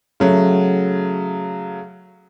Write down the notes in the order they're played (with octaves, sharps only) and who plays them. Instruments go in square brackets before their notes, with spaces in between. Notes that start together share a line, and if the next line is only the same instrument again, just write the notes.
[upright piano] C#3 F#3 A3